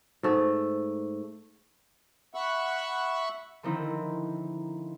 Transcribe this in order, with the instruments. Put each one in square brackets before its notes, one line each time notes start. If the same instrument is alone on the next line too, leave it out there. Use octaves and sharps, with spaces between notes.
[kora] G#2 A3
[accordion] E5 F#5 B5 C#6 E6 F#6
[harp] D3 D#3 F3 C4 D#4 E4